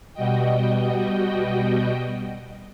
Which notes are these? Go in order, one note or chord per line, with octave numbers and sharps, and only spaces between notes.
B2 G3 F#4 D#5 G5